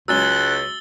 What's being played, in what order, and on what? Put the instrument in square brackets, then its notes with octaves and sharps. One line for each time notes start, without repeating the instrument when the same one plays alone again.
[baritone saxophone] C#2 [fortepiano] F#3 G#3 C#4 [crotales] E6 A6 G7 [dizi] F#6